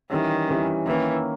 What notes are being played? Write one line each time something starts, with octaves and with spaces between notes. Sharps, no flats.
D#3 E3 G3 C#4
E3 G3 C#4
D#3 E3 A#3 C#4